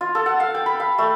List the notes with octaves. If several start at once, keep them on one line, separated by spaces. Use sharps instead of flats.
F4
A4
F#5
F5
G5
B5
F5
A3